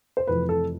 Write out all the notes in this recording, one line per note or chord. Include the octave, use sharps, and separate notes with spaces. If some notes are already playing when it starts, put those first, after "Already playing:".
C5
F1 F2 C3 E3 B4
A4